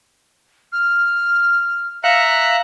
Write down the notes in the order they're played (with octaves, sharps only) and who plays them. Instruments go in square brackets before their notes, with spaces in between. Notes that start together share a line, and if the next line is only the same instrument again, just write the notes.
[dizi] F6
[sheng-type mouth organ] E5 A#5 F#6 [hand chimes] F5 C#7